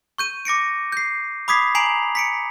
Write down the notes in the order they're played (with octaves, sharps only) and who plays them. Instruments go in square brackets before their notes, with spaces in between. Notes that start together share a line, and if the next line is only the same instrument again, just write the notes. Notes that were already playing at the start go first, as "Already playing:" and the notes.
[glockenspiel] C#6 G6 D#7
D6 A#6 C#7 D7
G6 C7
B5 D6 D#6 G#6 B6 C7
G#5 A#5 C7 D7 F7 F#7
B6 C#7 D7